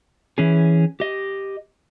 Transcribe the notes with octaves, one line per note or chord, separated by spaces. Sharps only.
E3 C#4 G#4
G4 D#5